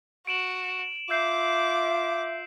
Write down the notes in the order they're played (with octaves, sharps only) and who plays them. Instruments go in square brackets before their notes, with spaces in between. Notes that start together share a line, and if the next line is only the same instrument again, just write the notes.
[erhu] F#4 [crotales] D7 E7 F#7
[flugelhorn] F4 [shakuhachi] E5 [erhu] D6 [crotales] E6 G6 C7